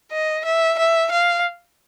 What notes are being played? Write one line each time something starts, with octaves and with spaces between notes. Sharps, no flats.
D#5
E5
E5
F5